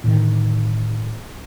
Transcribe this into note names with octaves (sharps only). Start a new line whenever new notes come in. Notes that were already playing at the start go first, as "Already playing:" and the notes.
A2 D3 D#3